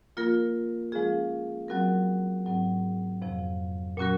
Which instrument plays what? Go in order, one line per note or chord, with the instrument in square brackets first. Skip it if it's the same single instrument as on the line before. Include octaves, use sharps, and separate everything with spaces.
[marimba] F3 A#3 F4 A#4
F3 G#3 C#4 F4 G#4
F#3 C4 F#4 A#4
G#2 F#3 C4
F2 C3 F3
A#2 F#3 C#4 F#4 A#4